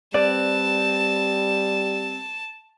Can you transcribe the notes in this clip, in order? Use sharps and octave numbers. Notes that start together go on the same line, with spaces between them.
G3 C4 B4 D5 A5